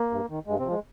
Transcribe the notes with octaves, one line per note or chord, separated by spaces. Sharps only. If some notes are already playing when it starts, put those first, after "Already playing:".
Already playing: A#3
G2
D#3
G2 G#3
C3 C4
F3
G#3